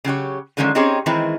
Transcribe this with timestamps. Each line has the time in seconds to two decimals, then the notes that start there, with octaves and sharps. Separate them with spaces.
0.04 C#3 F#3 G4 C#5
0.57 B2 D3 D#3 F3 G#3 C#4
0.75 C4 C#4 D#4 G4 G#4 C#5
1.06 D#3 E3 G#3 C4 E4